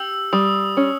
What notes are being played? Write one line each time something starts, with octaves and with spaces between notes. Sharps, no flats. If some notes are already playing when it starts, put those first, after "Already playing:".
Already playing: G4 E6
G3 D#6
C#4